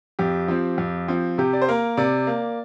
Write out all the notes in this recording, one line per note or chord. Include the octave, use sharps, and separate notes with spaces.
F2 G4
F3 C4
F2
F3 C4
C3 G4
D5
C5
A#3 A#4
C3 D5
A#3